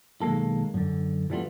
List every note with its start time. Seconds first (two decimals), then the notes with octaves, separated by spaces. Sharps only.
0.22 B1 D#3 G#3 A#3 A4
0.74 F#2 D3
1.30 E3 F3 G3 A3 B3 F4